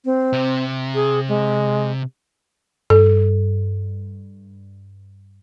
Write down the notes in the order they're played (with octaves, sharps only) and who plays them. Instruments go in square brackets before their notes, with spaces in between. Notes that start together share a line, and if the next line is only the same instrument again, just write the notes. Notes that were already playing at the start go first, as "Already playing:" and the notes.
[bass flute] C4
[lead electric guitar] C3
[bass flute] G#4
G#3
[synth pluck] G2 [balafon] A4